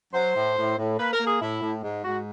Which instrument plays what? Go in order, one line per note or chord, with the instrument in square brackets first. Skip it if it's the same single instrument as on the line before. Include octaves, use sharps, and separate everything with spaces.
[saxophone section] F#3 C5
A2
A2
A2
A#3 B4
A#4
A#3
G#4
A2 E4
A2
G#2
G#2 F#4